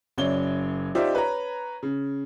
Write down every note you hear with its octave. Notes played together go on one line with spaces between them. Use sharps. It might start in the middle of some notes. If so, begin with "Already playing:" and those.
F#1 F#2 C#5 D5 G7
D#4 F4 G4 C5 D5 E5
B4 C#5 A#5
C#3